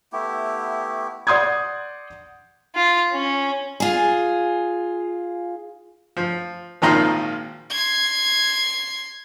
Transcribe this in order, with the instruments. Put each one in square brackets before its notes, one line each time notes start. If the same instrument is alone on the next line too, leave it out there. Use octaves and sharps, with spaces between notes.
[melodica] A3 B3 E4 G4
[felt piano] D5 F#5 C6 D#6 G6 G#6
[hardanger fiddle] F4
C#4
[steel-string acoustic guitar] F4 G#4
[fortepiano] F3
G#1 A#2 D#3 F3 A#5 C6
[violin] C6 G#6